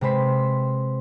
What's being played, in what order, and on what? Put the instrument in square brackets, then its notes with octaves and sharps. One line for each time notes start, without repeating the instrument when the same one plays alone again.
[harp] C3 G#3 B4 C5 B6